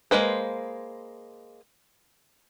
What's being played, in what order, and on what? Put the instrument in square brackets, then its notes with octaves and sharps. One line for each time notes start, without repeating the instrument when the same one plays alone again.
[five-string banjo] G#3 A#3 B4 C5